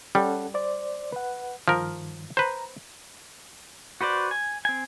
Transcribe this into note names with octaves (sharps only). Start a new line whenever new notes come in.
G3 C#4 A4 F#5
C5 D5
B4 F#5
G2 D#3 F3 A#4
B4 C5 A#5
F#4 B4 C5 D5
G#5
C4 G#5